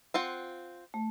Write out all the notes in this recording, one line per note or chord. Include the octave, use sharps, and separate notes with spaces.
C4 F4 F#5
A3